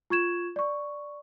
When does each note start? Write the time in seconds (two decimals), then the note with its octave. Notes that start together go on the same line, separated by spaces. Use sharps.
0.10 F4 C#6 G#6 E7
0.56 D5 C#6